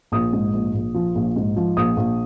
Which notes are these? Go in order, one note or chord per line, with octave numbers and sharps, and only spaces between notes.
A#1 D#6
G#2
A#1
A#1
F3
A#1
G#2
F3
A#1 D#6
A#1